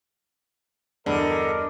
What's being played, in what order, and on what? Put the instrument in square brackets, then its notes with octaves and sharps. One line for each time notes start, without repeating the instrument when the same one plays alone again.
[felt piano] E2 G2 [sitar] D3 [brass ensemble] A#4 D#5